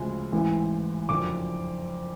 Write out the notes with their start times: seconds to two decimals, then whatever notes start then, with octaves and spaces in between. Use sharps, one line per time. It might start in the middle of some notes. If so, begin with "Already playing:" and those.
Already playing: D2 C#3 F3 G#3
0.32 A1 G#2 E3
1.09 F#1 F2 D3 D6